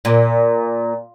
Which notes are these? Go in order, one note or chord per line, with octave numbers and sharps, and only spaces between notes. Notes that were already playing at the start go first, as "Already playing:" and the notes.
A#2